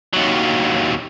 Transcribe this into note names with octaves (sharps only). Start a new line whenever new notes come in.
D#2 F#3